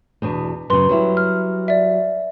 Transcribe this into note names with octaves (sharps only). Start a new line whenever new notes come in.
E2 B2 D4
F#2 C#3 B4 C6
F#3 G3 E4
F6
D5 E5